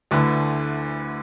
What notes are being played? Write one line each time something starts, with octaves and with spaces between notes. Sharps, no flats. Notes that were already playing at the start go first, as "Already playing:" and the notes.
D2 D3 A3 E4 B4